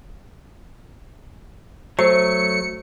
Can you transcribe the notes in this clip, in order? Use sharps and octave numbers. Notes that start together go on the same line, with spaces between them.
F#3 A3 C5 C#7